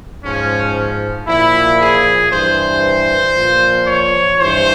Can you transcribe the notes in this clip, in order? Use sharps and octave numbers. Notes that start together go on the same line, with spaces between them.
G#2 F3 C#4
A#2 F3 E4
G#4
G2 E3 C5
A#2 F3
C#5
G2 E3 C5